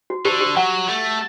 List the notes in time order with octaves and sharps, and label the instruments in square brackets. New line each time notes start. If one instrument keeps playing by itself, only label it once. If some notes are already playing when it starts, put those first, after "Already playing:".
[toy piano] F#4
[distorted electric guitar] D3 [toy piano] G4
[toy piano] G4
[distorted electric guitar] F#3 [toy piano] F#5
[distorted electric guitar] A3